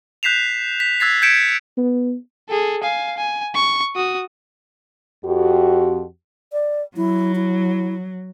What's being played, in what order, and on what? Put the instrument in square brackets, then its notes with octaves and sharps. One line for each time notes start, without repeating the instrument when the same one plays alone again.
[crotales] F#6 G6 B6 C7 E7 F7
B6
E6 F#6 G#6 A6 B6 C7
G6 G#6 B6 C#7 D7 E7
[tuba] B3
[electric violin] G#4 A4
F5 G#5
G#5
C#6
F#4 D#6
[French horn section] F2 F#4 G4
[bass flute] D5
[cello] F#3 [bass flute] E4
[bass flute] E4